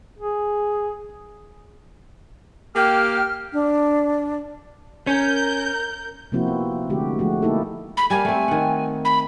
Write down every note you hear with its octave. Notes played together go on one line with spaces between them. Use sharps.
G#4
A#3 G4 G5 F6
D4
C#4 A#4 G6
C3 F3 A#3 C4 E4 F#4
B3
D3 G#3 A3 F#4 G4
F3 G#3 A3 F#4
A#3 D#4 E4 G4 A4
B5
G3 A#3 F5 G#5
A3 C4
D#3 F#5
B5